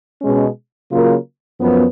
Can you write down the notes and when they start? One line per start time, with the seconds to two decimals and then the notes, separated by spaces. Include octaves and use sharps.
0.21 B2 G#3 C#4
0.91 C#3 F#3 A#3 F4 A#4
1.61 F#2 F3 B3